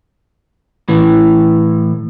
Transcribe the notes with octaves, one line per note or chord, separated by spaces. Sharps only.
A2 E3